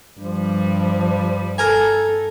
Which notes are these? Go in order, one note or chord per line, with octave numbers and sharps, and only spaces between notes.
G2 F3 G3
A4 A#4 G#5